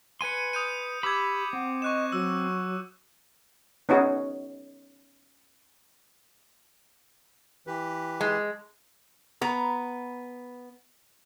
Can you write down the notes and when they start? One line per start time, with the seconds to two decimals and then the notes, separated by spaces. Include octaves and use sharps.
0.21 B4 G#5 C6 C#7 D#7
0.53 D#6 G6 D#7
1.03 G4 B5 D6 E6 G#6
1.53 C4 F#5
1.82 D#5 C#6 F#6 E7
2.12 F#3 E6
3.89 B3 C#4 D#4 F#4 G#4
7.67 E3 G4 B4
8.21 G#3
9.41 B3 A#5